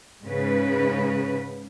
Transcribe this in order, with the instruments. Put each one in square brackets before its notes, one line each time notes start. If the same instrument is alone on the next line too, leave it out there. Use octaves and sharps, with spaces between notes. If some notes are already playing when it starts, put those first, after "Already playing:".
[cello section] G#2 C#3 B4